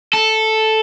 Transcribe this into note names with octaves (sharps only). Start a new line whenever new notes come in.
A4